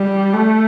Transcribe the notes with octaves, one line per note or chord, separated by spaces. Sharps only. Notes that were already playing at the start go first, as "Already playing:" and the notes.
Already playing: G3
A3